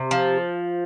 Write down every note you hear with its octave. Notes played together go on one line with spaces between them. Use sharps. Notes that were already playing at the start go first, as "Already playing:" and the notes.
Already playing: C3
F3